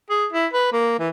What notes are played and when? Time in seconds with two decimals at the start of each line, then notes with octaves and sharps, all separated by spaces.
0.10 G#4
0.33 E4
0.53 B4
0.73 A#3
0.99 E3